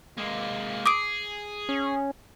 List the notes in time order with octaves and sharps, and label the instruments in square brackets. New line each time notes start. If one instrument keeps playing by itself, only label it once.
[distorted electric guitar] G#3 A#3
[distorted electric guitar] G#4 [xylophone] D6 D#6 D7
[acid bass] C#4